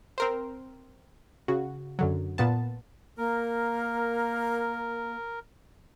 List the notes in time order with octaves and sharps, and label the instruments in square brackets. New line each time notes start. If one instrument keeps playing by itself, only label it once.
[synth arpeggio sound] C4 A#4 C5
C#3 F#4
F#2 D3 F#3
A#2 B3 A5
[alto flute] A#3 [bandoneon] A#4